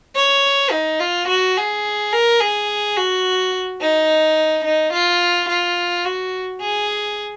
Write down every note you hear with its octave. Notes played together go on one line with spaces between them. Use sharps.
C#5
D#4
F4
F#4
G#4
A#4
G#4
F#4
D#4
D#4
F4
F4
F#4
G#4